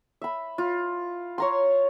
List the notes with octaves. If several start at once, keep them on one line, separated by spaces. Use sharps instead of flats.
E5 B5
F4
C#5 A#5 C6